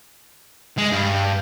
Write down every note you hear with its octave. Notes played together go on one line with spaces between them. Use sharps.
G#3
G2